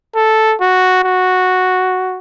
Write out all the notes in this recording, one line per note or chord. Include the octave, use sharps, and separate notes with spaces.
A4
F#4
F#4